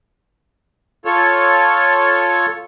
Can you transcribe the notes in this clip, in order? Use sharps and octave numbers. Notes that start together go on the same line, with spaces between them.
F4 A4 C#5